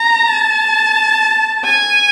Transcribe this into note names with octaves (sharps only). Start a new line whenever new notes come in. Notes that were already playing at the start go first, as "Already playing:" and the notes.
Already playing: A#5
A5
G#5